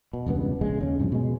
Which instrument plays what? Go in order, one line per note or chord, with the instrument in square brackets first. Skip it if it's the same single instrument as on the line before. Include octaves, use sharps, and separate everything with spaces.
[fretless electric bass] B2
E1 C#2 G2 B3
A#1 C#3 G#3
D#2 C#3 C#4
G2 C3 E3 F3
B2 G#3